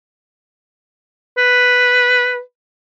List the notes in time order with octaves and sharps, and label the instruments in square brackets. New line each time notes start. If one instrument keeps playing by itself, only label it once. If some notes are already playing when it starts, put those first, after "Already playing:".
[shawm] B4